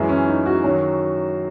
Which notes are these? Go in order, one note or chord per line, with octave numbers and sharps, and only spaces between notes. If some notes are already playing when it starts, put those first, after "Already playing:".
Already playing: F#2 E3 G#3 E4
C#4
D#4
F#4
F#2 D#3 F#3